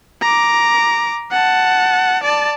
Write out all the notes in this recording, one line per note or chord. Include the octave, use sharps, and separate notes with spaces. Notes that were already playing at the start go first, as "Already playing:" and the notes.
A#5 D6
F#5 A5
D5 A5